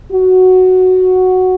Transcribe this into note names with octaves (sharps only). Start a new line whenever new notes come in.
F#4